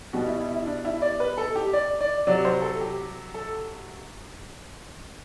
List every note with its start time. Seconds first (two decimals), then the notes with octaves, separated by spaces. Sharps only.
0.13 B2 G3 F#4
0.27 E4
0.40 E4
0.54 E4
0.66 D4
0.85 E4
1.02 D5
1.20 B4
1.38 A4
1.56 G4
1.73 D5
2.01 D5
2.27 C3 F#3 D5
2.45 C5
2.62 A4
2.81 G4
3.34 A4